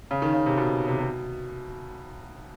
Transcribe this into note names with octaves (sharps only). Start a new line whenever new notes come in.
C#3
D#3
C#3
C3
B2
C3
C3
B2